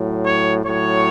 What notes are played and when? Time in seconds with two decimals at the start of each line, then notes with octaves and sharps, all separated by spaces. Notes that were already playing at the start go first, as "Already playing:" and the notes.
Already playing: A2 F#3
0.26 C#5
0.66 A2 F#3 C#5